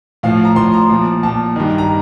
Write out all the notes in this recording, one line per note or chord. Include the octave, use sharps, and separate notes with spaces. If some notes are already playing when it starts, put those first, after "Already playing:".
A2 F3 F5
A#5
A2 F3 C6
A#5
A#2 F3
A#2 F3 A5
G2 D#3
A#5